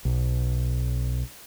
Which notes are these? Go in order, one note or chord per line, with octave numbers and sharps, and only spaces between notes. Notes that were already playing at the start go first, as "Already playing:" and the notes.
B1